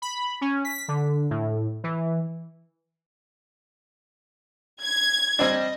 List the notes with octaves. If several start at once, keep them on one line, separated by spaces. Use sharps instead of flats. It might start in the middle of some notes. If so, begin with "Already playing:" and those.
B5
C#4
B6
D3
A2
E3
G#6
G3 C4 D4 D#5